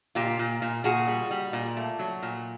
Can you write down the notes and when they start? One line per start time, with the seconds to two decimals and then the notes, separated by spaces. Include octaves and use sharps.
0.15 A#2 F4 G4
0.39 A#2
0.62 A#2
0.84 A#2 F#4 G#4
1.07 G3
1.31 G3
1.53 A#2
1.77 A3
1.99 F#3
2.22 A#2